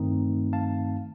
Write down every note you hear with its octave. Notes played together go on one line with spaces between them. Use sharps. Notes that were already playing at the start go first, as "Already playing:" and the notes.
Already playing: G2 D#3 A3 C4 D#4
F5 A5